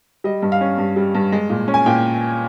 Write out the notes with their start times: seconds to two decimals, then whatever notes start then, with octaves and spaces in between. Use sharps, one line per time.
0.24 G3 D#5
0.42 G2
0.52 F5
0.61 C#4
0.78 G2
0.96 G3
1.15 G2
1.32 G#3
1.50 A#2
1.68 C#4
1.74 G#5
1.86 A#2 G5